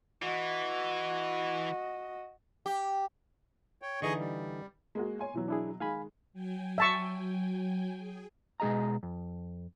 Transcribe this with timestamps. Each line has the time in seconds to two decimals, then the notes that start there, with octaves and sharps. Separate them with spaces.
0.22 E3 F#4 D#5
2.66 G4
3.82 C#5 G5
4.02 D3 E3 D#4 G#4 D#5 C#6
4.20 G3
4.95 G#3 A#3 F#4
5.19 C#5 G#5 C6
5.34 B2 E3 F#3
5.48 D4 E4 G#4
5.80 D#3 G#3 F5 G#5 B5
6.33 F#3 G5 G#5
6.78 E5 A5 C#6
7.98 G#4
8.60 B2 G#3 G#4 D#5 A#5
9.03 F2